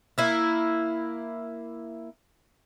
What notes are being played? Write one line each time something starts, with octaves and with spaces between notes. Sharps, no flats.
A#3 E4